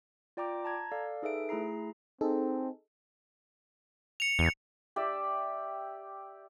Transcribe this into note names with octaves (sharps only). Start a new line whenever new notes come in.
F4 D5 G5 A#5 D6
A5 A#5 G#6
A4 D5 F5
D#4 G#4 A4 B4 E5 D7
A3 E4 G#4 A#5 C7
C4 D#4 G#4 A4
C#7 F7
E2
G4 D5 E5